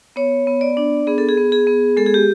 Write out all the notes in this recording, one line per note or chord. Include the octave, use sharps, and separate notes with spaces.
B3 C#5
B3
D5
D4
B3 G#4
A4
G#4
B3
G#4
B3
G#3 A4
G#4
G4